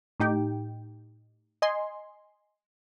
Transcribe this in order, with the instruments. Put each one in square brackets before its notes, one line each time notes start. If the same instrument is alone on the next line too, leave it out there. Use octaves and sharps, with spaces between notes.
[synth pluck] A2 D#4 G4 G5
D#5 G#5 C6